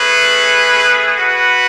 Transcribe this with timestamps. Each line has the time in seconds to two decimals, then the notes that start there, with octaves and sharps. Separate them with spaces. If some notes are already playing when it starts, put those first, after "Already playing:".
Already playing: A3 C#4 G#4 B4
1.16 F#4 B4 F#5